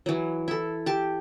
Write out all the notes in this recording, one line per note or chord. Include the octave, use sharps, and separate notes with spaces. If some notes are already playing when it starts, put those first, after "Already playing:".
E3 F#3
E4 A4
G4 A5